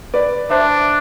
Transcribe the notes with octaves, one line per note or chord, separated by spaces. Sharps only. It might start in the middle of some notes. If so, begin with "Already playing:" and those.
B4 D5
D4 C5 E5